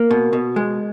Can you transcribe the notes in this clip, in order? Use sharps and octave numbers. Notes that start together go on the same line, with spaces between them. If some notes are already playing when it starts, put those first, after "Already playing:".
Already playing: A#3
B2
B2
G#3